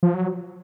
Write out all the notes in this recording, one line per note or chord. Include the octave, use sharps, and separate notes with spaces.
F3
F#3